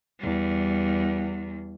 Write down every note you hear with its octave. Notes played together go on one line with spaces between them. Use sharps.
E2 G3